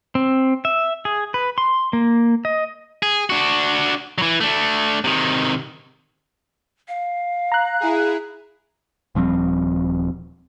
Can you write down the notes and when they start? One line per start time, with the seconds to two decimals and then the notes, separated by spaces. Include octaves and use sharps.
0.15 C4
0.65 E5
1.05 G#4
1.34 B4
1.58 C6
1.93 A#3
2.45 D#5
3.02 G#4
3.30 D4 F#4
4.18 E3 F#3
4.40 A3 D4
5.04 C3 D#3
6.88 F5
7.52 A#5 F#6
7.80 E4 G#4
9.15 D#1 F3 G3 C4